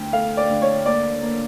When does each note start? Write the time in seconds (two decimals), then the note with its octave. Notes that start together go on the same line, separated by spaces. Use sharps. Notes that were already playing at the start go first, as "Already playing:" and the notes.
Already playing: D2 G5
0.13 A3 F5
0.37 D5
0.49 D2
0.62 C#5
0.86 A#3 D5
1.22 A#3